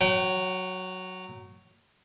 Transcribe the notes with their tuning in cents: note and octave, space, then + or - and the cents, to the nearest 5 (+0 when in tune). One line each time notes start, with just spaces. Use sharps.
F#3 +0 G5 -45